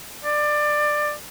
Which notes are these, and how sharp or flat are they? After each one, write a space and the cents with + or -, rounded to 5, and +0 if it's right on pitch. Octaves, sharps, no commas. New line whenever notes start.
D5 +20